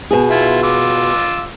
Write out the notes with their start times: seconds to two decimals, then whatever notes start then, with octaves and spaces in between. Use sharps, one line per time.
0.11 B2 G#4
0.31 E4 F4
0.63 F4 D6 E6